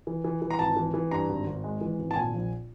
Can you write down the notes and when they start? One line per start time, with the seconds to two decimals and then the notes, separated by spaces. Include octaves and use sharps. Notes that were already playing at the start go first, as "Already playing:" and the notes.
0.07 E3
0.24 E3
0.42 E3
0.51 A#5
0.59 G#1 A5
0.77 E3
0.94 E3
1.11 G2 A#5
1.29 G#1
1.46 G#1
1.64 G#3
1.81 E3
1.99 G#1
2.11 A5
2.16 A#2 G#5
2.34 A#1